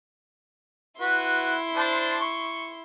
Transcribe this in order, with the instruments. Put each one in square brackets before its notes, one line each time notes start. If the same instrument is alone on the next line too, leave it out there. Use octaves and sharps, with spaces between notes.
[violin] E4 C6 [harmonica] F#4 B4
[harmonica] D4 C5 A5
C#6